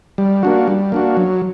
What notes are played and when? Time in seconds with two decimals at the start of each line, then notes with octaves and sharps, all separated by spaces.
0.18 G3
0.43 A#3 D4 F#4
0.68 G3
0.92 A#3 D4 F#4
1.17 F#3